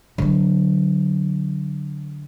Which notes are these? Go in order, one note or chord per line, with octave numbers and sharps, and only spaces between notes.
D3 F#3